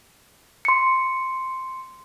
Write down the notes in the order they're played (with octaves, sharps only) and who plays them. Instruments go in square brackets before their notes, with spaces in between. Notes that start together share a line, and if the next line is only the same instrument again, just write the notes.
[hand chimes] C6 C#7